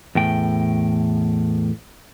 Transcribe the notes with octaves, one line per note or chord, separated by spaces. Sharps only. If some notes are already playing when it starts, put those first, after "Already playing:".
E2 A2 G5